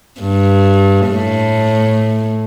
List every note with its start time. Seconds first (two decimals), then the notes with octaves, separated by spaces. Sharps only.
0.21 G2
1.08 A2